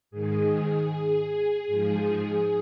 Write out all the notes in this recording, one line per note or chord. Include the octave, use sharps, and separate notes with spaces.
G#2 D#3 G#4
G#2 F3